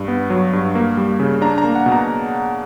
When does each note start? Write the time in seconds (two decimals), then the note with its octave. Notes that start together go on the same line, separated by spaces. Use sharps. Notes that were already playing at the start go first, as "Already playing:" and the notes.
Already playing: G2
0.08 B3
0.30 F#3
0.53 G2
0.75 A#3
0.97 G3
1.20 C#3
1.42 D4 A#5
1.58 A#5
1.64 A#3
1.75 F#5
1.86 B2
1.92 A#5